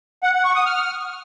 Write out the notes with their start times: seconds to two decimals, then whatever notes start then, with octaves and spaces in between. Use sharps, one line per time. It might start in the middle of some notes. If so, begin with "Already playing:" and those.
0.23 F#5
0.34 F#5
0.45 C#6
0.55 D#6
0.66 F6